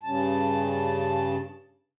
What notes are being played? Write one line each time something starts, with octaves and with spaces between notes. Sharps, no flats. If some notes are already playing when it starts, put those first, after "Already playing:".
G2 C#3 A5